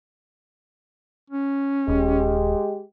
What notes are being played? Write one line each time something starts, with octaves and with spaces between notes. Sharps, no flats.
C#4
D#1 G#3 G4